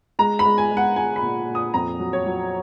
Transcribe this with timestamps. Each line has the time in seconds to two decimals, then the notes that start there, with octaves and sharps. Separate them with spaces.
0.19 G#3 A#5
0.39 B5
0.45 G#3
0.58 G#5
0.71 G#3
0.77 F#5
0.96 G#3 G#5
1.16 B5
1.22 A#2
1.48 A#2
1.55 D#6
1.74 F2 A#5
2.00 F#3
2.13 C#5
2.26 F#3